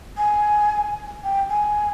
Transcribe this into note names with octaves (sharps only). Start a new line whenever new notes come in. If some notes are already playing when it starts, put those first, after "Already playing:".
G#5
G5
G#5